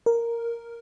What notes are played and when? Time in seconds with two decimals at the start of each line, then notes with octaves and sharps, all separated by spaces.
0.06 A#4